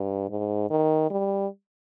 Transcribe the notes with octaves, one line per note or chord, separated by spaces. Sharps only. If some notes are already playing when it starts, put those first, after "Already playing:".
Already playing: G2
G#2
D#3
G3